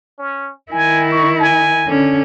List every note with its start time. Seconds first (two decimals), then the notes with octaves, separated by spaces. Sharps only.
0.19 C#4
0.72 D#3 E4 G#5
1.12 C#6
1.40 G#5
1.87 D3 C#4